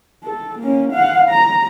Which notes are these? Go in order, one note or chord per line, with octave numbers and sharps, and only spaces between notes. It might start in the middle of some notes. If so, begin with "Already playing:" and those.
A4
A#3 C#4
F5 F#5
A#5